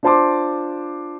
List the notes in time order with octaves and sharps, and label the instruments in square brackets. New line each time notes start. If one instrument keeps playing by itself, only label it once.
[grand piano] D4 F4 C5 A5 C6 D6